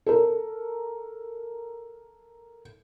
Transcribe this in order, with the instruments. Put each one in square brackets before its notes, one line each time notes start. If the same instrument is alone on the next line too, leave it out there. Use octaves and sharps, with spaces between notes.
[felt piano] A4 A#4